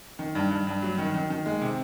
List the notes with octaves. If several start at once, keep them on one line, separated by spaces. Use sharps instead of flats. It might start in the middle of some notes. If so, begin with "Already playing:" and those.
D#3
G2
G2
G2
F#3
D#3
D#3
D#3
G#3
C3